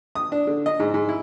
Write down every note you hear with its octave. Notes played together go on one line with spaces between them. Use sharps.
D#6
D4
D3
D#5
G#2
G#2
E4